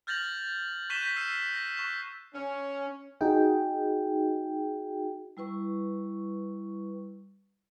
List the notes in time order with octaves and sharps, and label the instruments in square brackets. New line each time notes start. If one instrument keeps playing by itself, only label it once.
[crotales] F6 G6 A6 A#6 F7 F#7
C#6 F#6 B6 D#7 E7 G7
G6 A#6 B6
E6 F6 G6 C7 D#7
A#6
C#6 F#6 E7
[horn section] C#4
[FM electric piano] D#4 F#4 G#4 G5
[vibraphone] G3 E4 B4 C#6